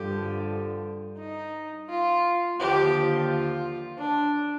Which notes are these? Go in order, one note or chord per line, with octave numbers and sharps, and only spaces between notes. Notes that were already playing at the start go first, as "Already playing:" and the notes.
Already playing: G2 D3 F3 G4
D#4
F4
D#2 D3 F3 G4
F4
D4